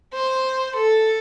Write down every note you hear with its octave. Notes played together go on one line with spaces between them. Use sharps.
C5
A4